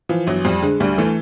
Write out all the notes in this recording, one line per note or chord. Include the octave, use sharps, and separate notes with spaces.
E3 F3
G1 F#3
F2 G3
D3 G#3
D2 G3
E3 A3